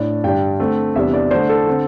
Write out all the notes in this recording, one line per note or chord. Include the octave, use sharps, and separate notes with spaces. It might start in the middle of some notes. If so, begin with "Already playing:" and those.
Already playing: A2 D4 D5
G2 D3 G3 D4 G5
D3 A3 C4
E2 C3 G3 D4 E5
D5
D3 A3 D4 C5
A4
D3 C4